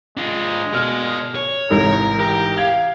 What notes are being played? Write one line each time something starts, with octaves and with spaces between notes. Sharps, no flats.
G#3 D4 F4
B2 A#4 D5 F6
C#5
A1 G#2 C3 A#4
G4 A#4
F5 G#6 F7